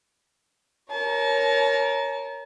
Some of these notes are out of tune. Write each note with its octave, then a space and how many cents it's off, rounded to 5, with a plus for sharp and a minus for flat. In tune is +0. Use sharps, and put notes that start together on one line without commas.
A#4 +5 C#5 +0 A5 -35